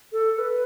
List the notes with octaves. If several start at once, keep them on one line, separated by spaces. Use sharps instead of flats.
A4
B4